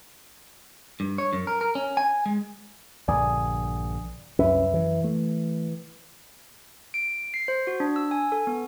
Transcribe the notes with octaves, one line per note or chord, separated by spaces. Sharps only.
G2
C#5
F#2
A#4
A#4
C#4
G#5
G#3
A#1 G2 D3 D5 G#5 D#6
C2 F#2 C#4 B4 E5
E3
A3
D7
C7
C5
F#4
D4
E6
G#5
A4
B3